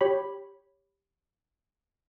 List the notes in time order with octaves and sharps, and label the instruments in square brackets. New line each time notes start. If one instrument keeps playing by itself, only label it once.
[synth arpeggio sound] G4 C#5 B5